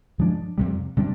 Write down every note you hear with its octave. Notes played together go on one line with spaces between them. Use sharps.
G2 F3 G#3 D4
F2 C3 G3
C3 G3 D4